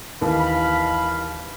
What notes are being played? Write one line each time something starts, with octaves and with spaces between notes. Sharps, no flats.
D#2 D#3 E3 F5 B5